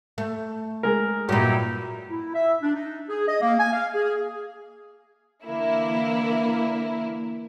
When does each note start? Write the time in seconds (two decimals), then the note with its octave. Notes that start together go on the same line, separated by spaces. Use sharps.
0.18 A3
0.83 G#3 A#4
1.29 G2 A#2 F#3 D#4 E4 G4
2.10 E4
2.35 E5
2.62 D4
2.76 D#4
3.09 G#4
3.28 D#5
3.41 A#3
3.60 G#5
3.72 F5
3.95 G#4
5.45 D3 E3 A#3 E4